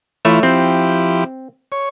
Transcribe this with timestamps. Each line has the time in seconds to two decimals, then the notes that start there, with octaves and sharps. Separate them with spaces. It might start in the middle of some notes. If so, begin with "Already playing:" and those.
0.25 E3 A3 E4 F4 C#5 E5
0.43 F3 C4 E4 G4
1.72 C#5